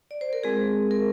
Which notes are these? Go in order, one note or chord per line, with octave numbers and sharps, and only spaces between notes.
D5
C5
A#4
G#3 C4 F4 G#4
A#4